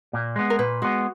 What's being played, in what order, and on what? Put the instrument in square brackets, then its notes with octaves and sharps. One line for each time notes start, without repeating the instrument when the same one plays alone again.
[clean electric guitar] A#2
G#3 B3
[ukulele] A#4
[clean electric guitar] A#2 [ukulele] B4
[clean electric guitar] G#3 B3 [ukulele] F#4